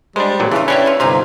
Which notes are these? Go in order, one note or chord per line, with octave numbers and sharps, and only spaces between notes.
G3 G#3 D4 C5
A1 A#2 F#3
C#3 E3 D4 F4
B3 C#4 D4 E4 G4 B4 C#5
E3 F4
G1 C3 D#4 C5 F5 G#5